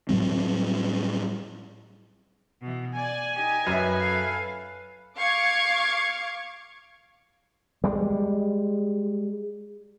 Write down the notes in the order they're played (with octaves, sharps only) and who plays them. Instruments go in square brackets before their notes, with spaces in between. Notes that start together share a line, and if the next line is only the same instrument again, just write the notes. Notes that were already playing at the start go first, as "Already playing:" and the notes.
[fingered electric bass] A2 F#3 G3 C4
[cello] B2 E3
[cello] D5 [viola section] G#5
[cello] D#4 G4
[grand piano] F#2 E5 [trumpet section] B4
[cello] A4 F5
[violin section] F5 C#6 D6 G#6
[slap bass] G3 G#3